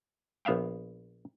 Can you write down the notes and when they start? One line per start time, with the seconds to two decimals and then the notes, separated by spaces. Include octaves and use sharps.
0.45 A#1 B3 E5 F5 G5